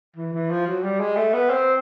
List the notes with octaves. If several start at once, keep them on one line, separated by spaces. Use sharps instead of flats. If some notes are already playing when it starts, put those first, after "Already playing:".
E3
E3
F3
F#3
G3
G#3
A3
B3
C4